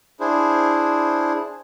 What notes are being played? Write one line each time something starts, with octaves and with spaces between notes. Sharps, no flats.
D4 E4 G#4 C5